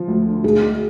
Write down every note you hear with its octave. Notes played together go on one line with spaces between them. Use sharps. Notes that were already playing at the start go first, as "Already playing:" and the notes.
Already playing: F3
D2
D3
D2 G#4
G#3